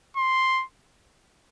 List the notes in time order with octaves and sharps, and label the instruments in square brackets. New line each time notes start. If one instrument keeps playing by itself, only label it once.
[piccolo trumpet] C6